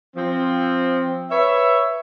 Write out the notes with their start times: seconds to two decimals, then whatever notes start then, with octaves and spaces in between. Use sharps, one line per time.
0.16 F3 C4
1.31 B4 C#5 E5